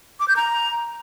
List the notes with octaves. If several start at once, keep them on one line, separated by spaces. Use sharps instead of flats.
D6
G6
A#5